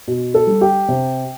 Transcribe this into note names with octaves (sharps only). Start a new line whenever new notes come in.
B2
A4
G3
G4
C3